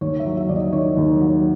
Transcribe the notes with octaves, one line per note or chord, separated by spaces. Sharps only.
D#2 C#5
E5
F#3
E5
D#2 D5
D#5
D#3 C#5
D#2
F#3